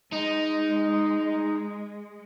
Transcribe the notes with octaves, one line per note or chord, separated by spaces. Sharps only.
G#3 D#4